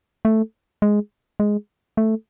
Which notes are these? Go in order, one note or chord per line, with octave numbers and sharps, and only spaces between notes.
A3
G#3
G#3
A3